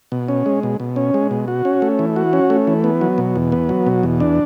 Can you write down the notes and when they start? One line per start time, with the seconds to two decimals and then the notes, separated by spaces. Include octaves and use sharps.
0.12 B2
0.28 C#4
0.46 G#3
0.63 B2
0.80 B2
0.96 C#4
1.14 G#3
1.31 B2
1.48 F#4
1.65 C#4
1.82 A3
1.99 E3
2.16 F#4
2.33 C#4
2.50 A3
2.67 E3
2.84 B3
3.01 F#3
3.18 B2
3.36 E2
3.52 B3
3.69 F#3
3.87 B2
4.03 E2
4.20 D4